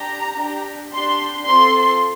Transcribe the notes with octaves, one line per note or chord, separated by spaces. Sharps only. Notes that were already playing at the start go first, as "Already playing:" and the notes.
Already playing: D4 G4 A#5
D4 G4
D4 G4 C6
C4 F4 A4 C6